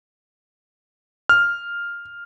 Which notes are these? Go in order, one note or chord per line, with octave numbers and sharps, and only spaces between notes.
F6